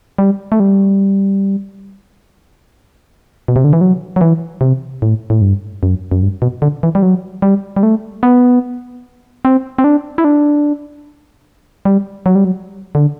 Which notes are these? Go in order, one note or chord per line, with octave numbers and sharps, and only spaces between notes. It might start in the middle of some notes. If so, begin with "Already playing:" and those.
G3
A3
G3
B2
C3
D3
E3
F#3
F#3
E3
C3
A2
A2
G2
F#2
F#2
G2
B2
D3
E3
G3
F#3
G3
G3
A3
B3
C4
C4
D4
E4
D4
G3
F#3
G3
F#3
D3